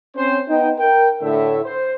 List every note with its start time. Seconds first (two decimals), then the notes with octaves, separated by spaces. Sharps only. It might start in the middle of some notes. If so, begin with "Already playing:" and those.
0.16 C4 C#4 C5
0.49 B3 D#4 D#5 G5
0.79 A#4 G5
1.21 A2 D3 E5
1.64 C5